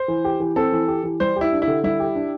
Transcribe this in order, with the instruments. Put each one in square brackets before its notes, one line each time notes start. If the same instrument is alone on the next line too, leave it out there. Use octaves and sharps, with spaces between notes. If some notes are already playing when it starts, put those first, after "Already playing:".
Already playing: [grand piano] C5
[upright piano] E3
G4
E3
[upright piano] C4 [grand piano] A4
[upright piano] E3
G4
E3
[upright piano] G3 [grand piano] C5
[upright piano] G4
[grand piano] E4
[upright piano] D4
[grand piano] E4
[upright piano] D3
[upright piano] G3 [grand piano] E4
[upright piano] G4
D4